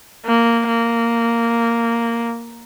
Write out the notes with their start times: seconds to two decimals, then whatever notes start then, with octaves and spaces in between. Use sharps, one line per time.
0.25 A#3
0.68 A#3